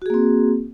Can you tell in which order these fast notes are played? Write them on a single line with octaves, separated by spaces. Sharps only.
F#4 G#4 A#3 C4